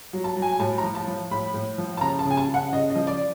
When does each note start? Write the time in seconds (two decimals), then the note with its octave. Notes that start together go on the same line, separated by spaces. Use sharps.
0.13 F#3
0.24 A5
0.36 F#3
0.42 G#5
0.52 G#5
0.59 A2 A5
0.78 A#5
0.83 F3
0.95 A5
1.07 F3
1.31 A2 B5
1.54 A2
1.78 F3
1.97 A5
2.01 C#3 A#5
2.19 A5
2.25 C#3
2.31 G#5
2.37 A5
2.49 C#3
2.54 F#5
2.73 C#3 D#5
2.90 D#5
2.95 F3
3.07 D5